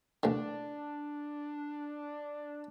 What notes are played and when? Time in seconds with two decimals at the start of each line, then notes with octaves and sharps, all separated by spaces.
0.23 A1 D3 D4